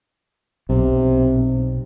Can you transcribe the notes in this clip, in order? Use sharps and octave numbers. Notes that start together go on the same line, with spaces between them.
B1 C3